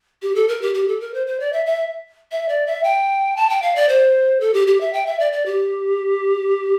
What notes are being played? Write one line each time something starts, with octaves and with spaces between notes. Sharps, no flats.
G4
A4
A#4
G4
G4
A4
A#4
C5
C5
D5
E5
E5
E5
D5
E5
G5
A5
G5
F5
D5
C5
A4
G4
G4
E5
G5
E5
D5
D5
G4